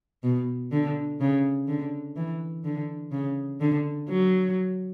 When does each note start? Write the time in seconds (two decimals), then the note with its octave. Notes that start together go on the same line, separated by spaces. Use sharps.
0.23 B2
0.72 D3
1.20 C#3
1.68 D3
2.16 E3
2.64 D3
3.12 C#3
3.60 D3
4.09 F#3